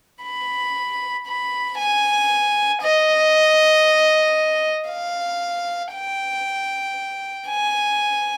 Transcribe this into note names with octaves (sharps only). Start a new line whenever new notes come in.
B5
B5
G#5
D#5
F5
G5
G#5